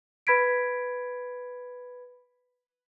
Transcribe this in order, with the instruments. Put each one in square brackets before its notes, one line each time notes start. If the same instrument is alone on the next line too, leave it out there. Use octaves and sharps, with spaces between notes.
[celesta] B4 B5 G#6 B6 D7